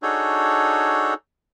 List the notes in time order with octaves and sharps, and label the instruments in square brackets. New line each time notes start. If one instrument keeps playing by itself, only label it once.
[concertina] D4 D#4 F#4 G#4 A4 C#5